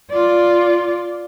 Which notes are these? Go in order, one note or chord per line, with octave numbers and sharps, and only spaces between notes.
F4 D5